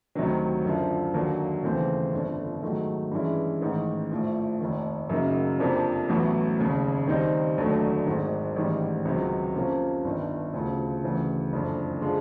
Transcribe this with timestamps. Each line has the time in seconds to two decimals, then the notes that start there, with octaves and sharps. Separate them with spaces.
0.15 D2 C3 D#3 F#3
0.65 F#2 D3 F3
1.13 D#2 D3 F#3 A#3
1.64 D#2 C#3 E3 A3 C4
2.13 G1 F2 D3
2.62 G#2 D#3 F#3 A3
3.11 G2 E3 G#3 C#4 E4
3.61 A1 G#2 D#3
4.10 A#1 A2 F3
4.60 F1 D#2 D#3
5.09 F#2 C#3 F#3 A#3 D#4
5.59 F2 C3 F3 A#3 D4
6.09 A1 A2 F#3 B3
6.58 F1 D#2 C#3
7.07 D#2 D#3 G3 C4 D#4
7.57 F1 D#2 D3 F#3 A3
8.06 G#1 G#2 D#3
8.56 A1 G#2 D#3 G3
9.05 C#2 C3 D#3 F#3
9.55 F2 C3 F3 A#3 C#4
10.05 G1 G2 D#3
10.54 D2 C#3 F3
11.04 D2 C#3 E3
11.52 F#1 F2 D3
12.02 D3 F3 G#3